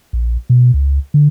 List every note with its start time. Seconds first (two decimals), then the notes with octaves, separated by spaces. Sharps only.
0.13 A#1
0.50 B2
0.74 C#2
1.14 D3